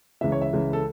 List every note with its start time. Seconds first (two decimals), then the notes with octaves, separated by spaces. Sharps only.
0.21 C#2 C#3 E3 E5
0.32 C#5
0.41 E5
0.53 C#2 C#3 E3
0.73 A4